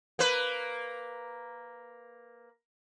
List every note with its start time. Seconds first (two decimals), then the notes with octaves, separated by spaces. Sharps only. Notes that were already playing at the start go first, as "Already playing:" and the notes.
0.19 A#3 B4